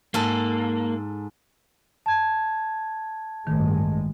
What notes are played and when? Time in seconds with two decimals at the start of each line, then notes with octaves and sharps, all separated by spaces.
0.14 G#2 A#3 A4
2.06 A5 G#6
3.47 A1 G2 D#3 G#3 A3